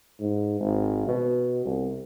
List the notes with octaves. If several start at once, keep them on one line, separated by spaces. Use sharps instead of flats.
G#2
G#1
B2
C2